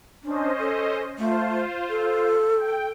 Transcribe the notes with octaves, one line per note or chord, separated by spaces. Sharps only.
C#4 D4 C5 D#5
A4
A3 F4 C5
A4
G5